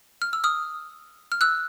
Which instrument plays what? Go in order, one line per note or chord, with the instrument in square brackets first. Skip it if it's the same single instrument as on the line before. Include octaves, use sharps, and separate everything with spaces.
[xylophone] F6
E6
D#6 F6
F6
E6 F#6